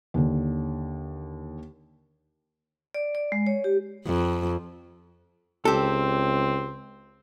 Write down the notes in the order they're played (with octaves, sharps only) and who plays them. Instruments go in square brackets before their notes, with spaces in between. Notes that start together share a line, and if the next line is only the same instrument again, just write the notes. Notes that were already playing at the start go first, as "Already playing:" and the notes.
[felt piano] D#2 D3
[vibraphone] D5
D5
G#3
C#5
G4
[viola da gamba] F2
[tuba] C#2 [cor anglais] C4 [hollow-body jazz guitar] G4 A4